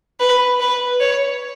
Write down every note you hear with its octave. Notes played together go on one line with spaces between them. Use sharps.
B4
B4
C#5